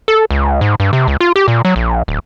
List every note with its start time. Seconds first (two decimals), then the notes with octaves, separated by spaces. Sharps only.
0.08 A4
0.31 C#2
0.61 G#2
0.80 G2
0.93 C3
1.08 C#2
1.20 F4
1.36 G4
1.48 A#2
1.65 F#3
1.76 A#1
2.08 D1